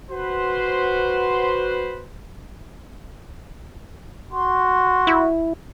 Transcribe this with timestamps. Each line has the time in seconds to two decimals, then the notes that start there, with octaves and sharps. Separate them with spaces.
0.10 F#4 B4 C5
4.32 F#4 C6
5.07 E4